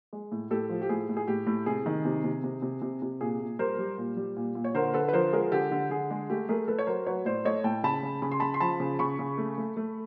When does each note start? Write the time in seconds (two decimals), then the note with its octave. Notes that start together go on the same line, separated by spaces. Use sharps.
0.13 G#3
0.32 A2
0.51 A2 G4 A4
0.69 F3
0.82 G4
0.89 A2 G#4
1.09 A2
1.17 G#4
1.28 A2 G4
1.47 A2
1.66 C3 G#4
1.86 D#3
2.05 C3
2.24 C3
2.44 C3
2.62 C3
2.82 C3
3.02 C3
3.21 A#2 G#4
3.40 A#2
3.59 G3 A#4 C5
3.78 G3
3.98 A#2
4.17 G3
4.36 A#2
4.55 A#2
4.64 C#5
4.74 D3 A#4 C5
4.94 D3 A4 B4
5.09 B4
5.13 F3 A#4 C5
5.33 G#3 G#4 A#4
5.52 D3 G4 A4
5.71 D3
5.90 D3 G#4
6.10 G#3
6.30 A3 G4
6.49 A3 G#4 A#4
6.68 A3 A4 B4
6.79 C#5
6.87 F#3 A#4 C5
7.07 F#3 B4 C#5
7.25 A2 C5 D5
7.45 A3 C#5 D#5
7.64 A2 G5 A5
7.83 C#3 A5 B5
8.03 C#3
8.22 C#3 B5
8.32 C6
8.40 C#3 A5 B5
8.54 C6
8.60 F3 A5 B5
8.80 C#3
8.99 C#3 B5 C#6
9.19 C#3
9.38 A3
9.58 A3
9.77 A3